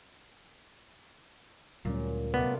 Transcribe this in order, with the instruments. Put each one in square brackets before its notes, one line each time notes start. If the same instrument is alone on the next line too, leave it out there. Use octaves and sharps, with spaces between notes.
[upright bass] D2 [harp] A#2 [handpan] F#3 G3 C#4
[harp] C3 A3 [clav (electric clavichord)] B3 [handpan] F4 A#4 D5